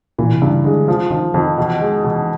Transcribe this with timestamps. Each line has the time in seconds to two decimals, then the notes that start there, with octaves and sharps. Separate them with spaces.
0.18 A#2 E3
0.34 C3
0.42 G2 C#3
0.64 D3 G#3
0.88 F3
1.11 D#3 F3
1.34 F2 D#3
1.58 B2 E3
1.80 D#3 G#3
2.04 B2 E3